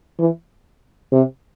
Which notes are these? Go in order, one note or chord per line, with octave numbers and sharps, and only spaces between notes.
E3
C3